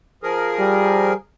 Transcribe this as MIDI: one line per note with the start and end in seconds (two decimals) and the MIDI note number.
0.23 1.13 53
0.23 1.13 68
0.23 1.13 70
0.59 1.13 55